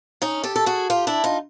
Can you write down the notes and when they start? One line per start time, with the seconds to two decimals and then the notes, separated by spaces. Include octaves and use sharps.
0.22 C#4 D#4
0.44 G4 A4
0.56 A4
0.66 F#4 G#4
0.90 F4 G4
1.07 D4 E4
1.24 D#4 F4